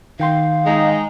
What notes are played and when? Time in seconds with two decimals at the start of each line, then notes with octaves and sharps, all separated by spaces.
0.20 D#3 F5 G5 C6
0.66 G#3 D#4